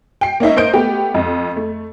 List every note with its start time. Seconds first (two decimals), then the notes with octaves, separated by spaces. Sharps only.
0.21 G5 C7
0.40 A#3 C#4 D#4 E5
0.56 A#3 C5 D#5 G6 D7
0.73 A3 B3 G4
1.14 F2
1.56 A3